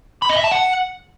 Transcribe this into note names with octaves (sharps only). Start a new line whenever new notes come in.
B5
D#5
E5
A5
F#5